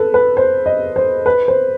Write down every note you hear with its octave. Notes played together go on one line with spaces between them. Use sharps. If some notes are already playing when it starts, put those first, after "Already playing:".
Already playing: A4 B4
B4
C5
D#5
C5
B4
C5